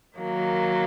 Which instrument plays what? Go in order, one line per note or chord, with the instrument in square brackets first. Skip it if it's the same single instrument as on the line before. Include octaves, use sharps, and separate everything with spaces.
[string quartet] D#3 F#3 A#3